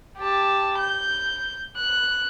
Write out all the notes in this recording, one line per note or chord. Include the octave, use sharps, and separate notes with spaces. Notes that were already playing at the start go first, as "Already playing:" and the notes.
G4 A5
G6
F#6